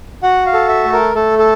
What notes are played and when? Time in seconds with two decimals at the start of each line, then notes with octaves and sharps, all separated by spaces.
0.23 F#4 F#5
0.46 F5
0.53 A4
0.69 E5
0.84 A3
0.93 A#4
1.15 A3 A4
1.39 A4